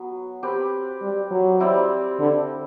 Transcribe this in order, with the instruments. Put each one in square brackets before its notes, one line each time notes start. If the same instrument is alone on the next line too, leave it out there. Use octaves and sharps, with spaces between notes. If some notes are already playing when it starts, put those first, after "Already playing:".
Already playing: [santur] F#3 B3
C4 G4 B4
[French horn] G3
F#3
[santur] G3 C4 E4
[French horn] D3